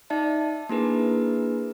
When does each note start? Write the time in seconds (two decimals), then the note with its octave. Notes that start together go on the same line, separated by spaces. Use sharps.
0.10 D#4 D5 E5 A5
0.69 A#3 D4 E4 G#4 A#4 B4